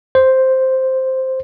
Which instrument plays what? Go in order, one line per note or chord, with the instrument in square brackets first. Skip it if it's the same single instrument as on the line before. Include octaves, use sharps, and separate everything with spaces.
[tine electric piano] C5